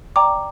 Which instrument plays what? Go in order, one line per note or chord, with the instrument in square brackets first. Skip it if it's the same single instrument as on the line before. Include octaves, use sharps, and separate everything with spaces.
[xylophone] D5 G5 A#5 D6